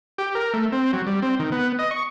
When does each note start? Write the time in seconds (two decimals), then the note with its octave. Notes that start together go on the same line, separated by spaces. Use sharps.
0.18 G4
0.35 A#4
0.54 A3
0.72 C4
0.93 F#3
1.07 G3
1.22 C4
1.39 D#3
1.52 B3
1.79 D#5
1.91 C#6